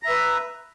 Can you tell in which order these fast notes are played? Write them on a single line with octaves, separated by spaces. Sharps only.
A#5 E5 B4